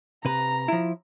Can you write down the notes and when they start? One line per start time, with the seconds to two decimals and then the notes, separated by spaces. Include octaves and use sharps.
0.25 C3 B4 A#5
0.68 F3 E4